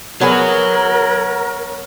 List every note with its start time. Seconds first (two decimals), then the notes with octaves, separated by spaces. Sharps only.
0.21 F#3 B3 G#4 A#4 C#5 F#5